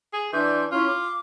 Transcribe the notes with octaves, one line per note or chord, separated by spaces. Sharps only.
G#4
E3 D4 C6 G6
C#4 E4 F4 C6
D6